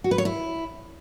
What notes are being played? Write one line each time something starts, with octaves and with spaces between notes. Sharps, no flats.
F#4
B4
C#5
E4